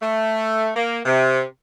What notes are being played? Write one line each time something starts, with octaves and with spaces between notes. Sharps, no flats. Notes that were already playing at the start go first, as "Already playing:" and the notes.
A3
A#3
C3